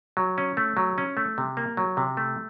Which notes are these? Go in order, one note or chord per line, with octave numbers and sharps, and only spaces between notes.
F#3
C#4
A3
F#3
C#4
A3
C3
A#3
F#3
C3
A3